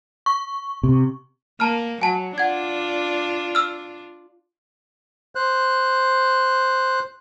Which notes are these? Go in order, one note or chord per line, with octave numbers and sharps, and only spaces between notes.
C#6
C3
A#3 A5 A#5 F6
F#3 G#5 A5
D4 F4 F#5 G#6
E6 F6
C5 F#6